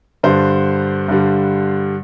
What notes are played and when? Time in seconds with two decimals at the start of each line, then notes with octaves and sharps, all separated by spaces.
0.23 G2 D3 G3 C5
1.08 G2 D3 G3